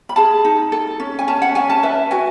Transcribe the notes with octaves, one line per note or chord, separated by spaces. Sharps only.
B5
G#4 A5
D#4
A4
C#4
G#5
C#4 A5
F#5
C#4 G#5
A5
B4 E5
F#4 G#5